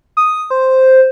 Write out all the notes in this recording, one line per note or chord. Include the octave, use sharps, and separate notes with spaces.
D#6
C5